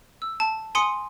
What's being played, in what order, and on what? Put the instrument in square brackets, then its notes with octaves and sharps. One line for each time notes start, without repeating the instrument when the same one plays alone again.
[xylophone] E6
A5
G#5 C6 D#6 C#7